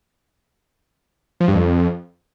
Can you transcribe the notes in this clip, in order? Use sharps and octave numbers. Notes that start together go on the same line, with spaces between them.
F3
G2
F2